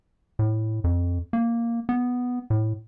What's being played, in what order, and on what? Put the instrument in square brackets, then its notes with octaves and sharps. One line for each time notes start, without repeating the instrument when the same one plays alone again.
[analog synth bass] A2
F2
A#3
B3
A2